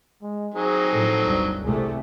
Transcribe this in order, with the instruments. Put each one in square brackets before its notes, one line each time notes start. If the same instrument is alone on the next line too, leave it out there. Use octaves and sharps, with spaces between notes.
[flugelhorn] G#3
[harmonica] F#3 C4 D#4 [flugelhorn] G#4
[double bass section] A2 F3 [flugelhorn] A4
[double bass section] G1 D2 G2
[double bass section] C2 C3 A3 [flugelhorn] G#4